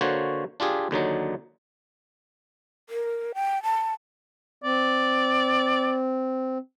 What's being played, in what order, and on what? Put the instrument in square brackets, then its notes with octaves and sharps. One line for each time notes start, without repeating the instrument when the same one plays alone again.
[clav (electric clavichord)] D3 A#3 F#4 C5 C#5
D4 F4 G4 G#4
D#2 D3 F#3 D#4
[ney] A#4
G5
A5
[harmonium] C4 [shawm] D5